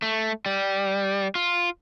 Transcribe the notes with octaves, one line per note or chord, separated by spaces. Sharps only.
A3
G3
F4